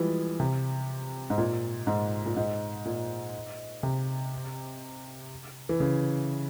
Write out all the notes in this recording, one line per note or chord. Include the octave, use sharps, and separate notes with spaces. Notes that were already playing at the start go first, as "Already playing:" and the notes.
Already playing: E3 F3 G3 G#3
C3
G#2
A#2
G#2
A#2
G#2
A#2
C3
E3
C#3